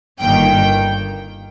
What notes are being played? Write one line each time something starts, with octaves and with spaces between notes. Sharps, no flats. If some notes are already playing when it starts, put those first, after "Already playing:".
G1 G2 D#3 A#3 G5